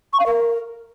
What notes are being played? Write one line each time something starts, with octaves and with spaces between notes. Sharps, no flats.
C#6
F5
A#4